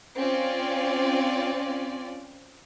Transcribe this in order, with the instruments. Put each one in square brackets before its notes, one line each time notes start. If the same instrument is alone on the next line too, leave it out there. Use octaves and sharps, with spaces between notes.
[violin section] C4 C#4 F4 D5